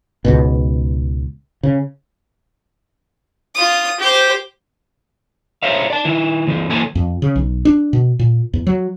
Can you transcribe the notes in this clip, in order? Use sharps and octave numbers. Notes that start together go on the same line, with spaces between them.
C#2 G#2 B2
C#3
F4 D#6
G4 C5
A#4 C5 C#5 E5 F5
D5 A5
D#3 E4
A2 E3 C4
E3 A#3 E4 A4 C5 G#5
F2
C#3
B1
D4
B2
A#2
E2
F#3